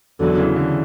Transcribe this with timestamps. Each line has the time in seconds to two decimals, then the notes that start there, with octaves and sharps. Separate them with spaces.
0.20 E2 D3 F#3
0.37 C#3 E3
0.56 D3